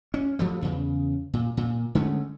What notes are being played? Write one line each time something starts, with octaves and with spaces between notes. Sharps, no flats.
C#4
F3 G3 A3
E2 C#3
A#2
A#2
D3 G#3 A3 C#4